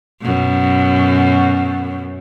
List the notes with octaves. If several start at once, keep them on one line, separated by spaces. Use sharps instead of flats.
F#2 B2